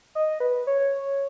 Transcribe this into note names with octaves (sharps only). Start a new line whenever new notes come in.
D#5
B4
C#5